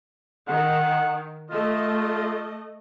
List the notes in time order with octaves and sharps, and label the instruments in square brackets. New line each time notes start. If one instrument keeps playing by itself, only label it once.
[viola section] D#3 [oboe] F#5
[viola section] A3 D#5 [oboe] F4